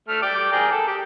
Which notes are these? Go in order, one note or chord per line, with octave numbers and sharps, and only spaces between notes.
A3 F6
D5 G5 D6
G#4 A#4 G5
A4
G4